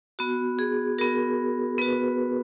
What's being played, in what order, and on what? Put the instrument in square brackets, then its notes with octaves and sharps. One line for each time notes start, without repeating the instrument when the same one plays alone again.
[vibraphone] B3 F#4
G#4
B3 F#4 A#4
B3 F#4 B4